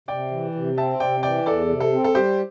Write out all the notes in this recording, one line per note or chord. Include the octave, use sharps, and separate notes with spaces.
C3 D5 G5
E3
C3
C4 E5 A5
C3 D5 G5
E3 D5 G5
E2 A4 D5
C3
A4
C4
A4
G3 G4 C5